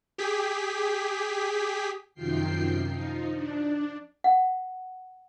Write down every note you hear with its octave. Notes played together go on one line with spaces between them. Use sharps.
G4 G#4 B6
F#2 C3 D#3 F3 G5 C7
F3 D#4
D4
F#5